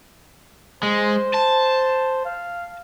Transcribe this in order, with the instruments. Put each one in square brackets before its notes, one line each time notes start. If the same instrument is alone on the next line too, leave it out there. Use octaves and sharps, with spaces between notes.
[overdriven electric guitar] G#3 [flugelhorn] C5
[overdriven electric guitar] A5
[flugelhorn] F5